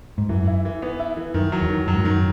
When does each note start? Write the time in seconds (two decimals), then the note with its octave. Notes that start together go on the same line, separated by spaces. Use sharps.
0.18 G#2
0.29 F#2 E3
0.47 E4
0.65 E3
0.82 B3
1.00 E4
1.17 E3
1.34 F#2 D#3
1.52 F#3
1.61 E2
1.70 D#3
1.87 F#2 F#3
1.95 G#2
2.04 F#2 D#3